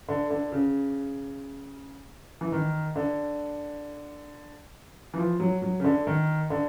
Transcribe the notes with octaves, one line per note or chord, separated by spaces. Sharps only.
D3
D3
C#3
E3
D#3
D3
E3
F3
F#3
F#3
C#3
D3
D#3
D3